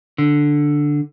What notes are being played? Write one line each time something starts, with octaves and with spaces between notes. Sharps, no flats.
D3